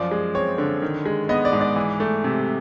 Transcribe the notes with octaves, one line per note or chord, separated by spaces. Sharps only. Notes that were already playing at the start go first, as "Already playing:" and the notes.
Already playing: F#2 F3 D5
G#3
C4 C#5
D3
D#3
G#3
B3 D#5
D5
G#2
D5
E3
A3
C3